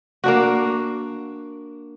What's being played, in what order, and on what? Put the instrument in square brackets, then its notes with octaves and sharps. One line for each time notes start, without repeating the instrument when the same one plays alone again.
[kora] A#3 D4 F#4